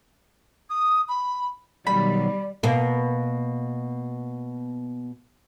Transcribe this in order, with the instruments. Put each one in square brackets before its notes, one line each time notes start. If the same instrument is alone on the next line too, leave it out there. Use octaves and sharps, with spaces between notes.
[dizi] D#6
B5
[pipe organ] B2 D#3 F#3 [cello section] G3 [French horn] D5 [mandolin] B5
[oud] B2 A#3